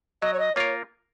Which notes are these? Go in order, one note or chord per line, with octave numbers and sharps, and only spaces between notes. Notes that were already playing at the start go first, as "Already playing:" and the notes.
F#3 D#5
C#5
D#5
A#3 F4 A#4 C#5